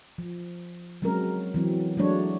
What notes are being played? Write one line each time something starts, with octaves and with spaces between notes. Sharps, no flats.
F3
F#3 G#3 C4 C#4 A#4
E3 F#3 C4
F#3 G#3 A3 D4 C#5